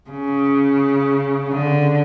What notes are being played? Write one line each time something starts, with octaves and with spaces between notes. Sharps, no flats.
C#3
D3